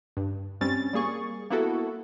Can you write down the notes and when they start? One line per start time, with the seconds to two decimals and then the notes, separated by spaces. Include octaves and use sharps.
0.17 G2
0.61 G2 G3 C4 C#4 A6
0.93 G3 A#3 G#4 C#6
1.50 A#3 B3 E4 F#4 A4